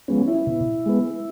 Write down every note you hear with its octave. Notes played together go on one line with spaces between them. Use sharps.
F3 G#3 B3 C#4
E4
B2
G#3 B3